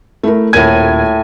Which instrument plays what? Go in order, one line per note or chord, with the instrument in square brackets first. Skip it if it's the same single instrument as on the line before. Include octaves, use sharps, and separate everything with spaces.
[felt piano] A3 E4 A#4
[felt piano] D#1 A#4 G#6 [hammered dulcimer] A2 G#5